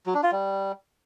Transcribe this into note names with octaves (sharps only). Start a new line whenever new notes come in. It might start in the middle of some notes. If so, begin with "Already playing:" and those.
F#3
D4
F4
G3